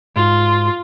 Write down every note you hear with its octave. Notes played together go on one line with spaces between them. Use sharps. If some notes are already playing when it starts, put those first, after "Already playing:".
G#2 F4